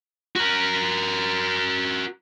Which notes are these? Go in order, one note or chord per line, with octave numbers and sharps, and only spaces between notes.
F#4 A#4